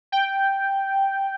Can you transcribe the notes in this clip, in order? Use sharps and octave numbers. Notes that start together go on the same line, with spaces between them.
G5